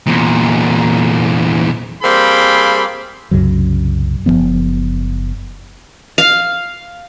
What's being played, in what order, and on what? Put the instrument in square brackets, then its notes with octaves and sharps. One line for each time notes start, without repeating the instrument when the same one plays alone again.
[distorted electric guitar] E2 A#2
[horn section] G3 A#3 C4 G#4 B5
[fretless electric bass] C2 F#2 C#3 F#3
F#1 F#2 F3 B3
[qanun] F5